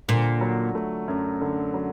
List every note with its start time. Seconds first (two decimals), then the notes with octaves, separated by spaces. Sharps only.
0.08 A#2 D3
0.41 F#3
0.75 A3
1.08 F#2
1.41 D3
1.74 F#3